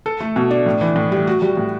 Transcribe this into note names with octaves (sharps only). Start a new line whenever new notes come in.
A4
A3
B2
D4
A2
E3
A2
G3
F#4
G3
A2